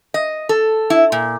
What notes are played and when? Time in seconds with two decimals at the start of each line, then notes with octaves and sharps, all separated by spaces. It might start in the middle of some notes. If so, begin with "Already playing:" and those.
0.14 D#5
0.49 A4
0.90 E4
1.12 A#2